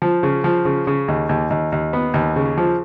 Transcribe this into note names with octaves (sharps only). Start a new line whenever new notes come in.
F3
C#3
F3
C#3
C#3
D#2
D#2
D#2
D#2
B3
D#2
C#3
F3